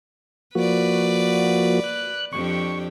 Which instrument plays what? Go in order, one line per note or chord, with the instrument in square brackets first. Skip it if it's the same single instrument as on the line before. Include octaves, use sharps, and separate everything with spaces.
[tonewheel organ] F3 A#3 F#4 [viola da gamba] B4 D5
[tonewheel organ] F#6
[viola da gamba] F2 D4 G4 [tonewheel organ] C#6